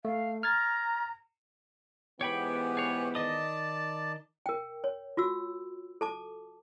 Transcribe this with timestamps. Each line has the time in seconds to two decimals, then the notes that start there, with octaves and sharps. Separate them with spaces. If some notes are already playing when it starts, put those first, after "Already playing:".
0.05 A3 F5
0.43 A#5 F6 G#6 A6
2.21 G#2 E3 B3 G4 C#5 G5 B5
2.77 G#4 C#5
3.15 D#3 D5 D#5 A5 D#6
4.46 A#4 G5
4.84 C#5
5.17 F4 F#4 E6
6.01 A4 A5 D6